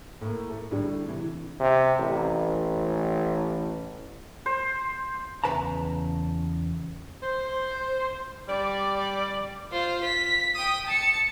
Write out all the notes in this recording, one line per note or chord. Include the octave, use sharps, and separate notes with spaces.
A2 A#3
A3
A2 D3 G3
C3 E3
C3
A1
C5
E2 C#3 B4 A5 A#5
C5
G3 D5
F4 C5
B6
G5 D#6
A5 C#7